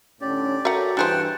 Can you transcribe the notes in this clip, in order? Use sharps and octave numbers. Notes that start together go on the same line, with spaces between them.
A2 D3 C#4 G4 D5
F#4 A4 A#4 C#5 E5 F#5 A#5
G2 E3 D4 G#4 C5 F#5 G5 A5